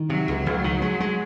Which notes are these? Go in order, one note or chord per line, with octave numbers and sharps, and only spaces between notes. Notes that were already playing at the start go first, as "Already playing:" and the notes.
Already playing: D#3
C3 F#3
C#2
C#2
D#3
G#3
G#3